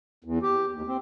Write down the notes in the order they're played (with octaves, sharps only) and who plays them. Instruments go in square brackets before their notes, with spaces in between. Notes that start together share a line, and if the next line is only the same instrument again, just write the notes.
[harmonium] E2
G4
D#2
C4